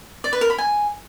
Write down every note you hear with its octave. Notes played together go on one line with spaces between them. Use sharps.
D5
B4
A#4
B5
G#5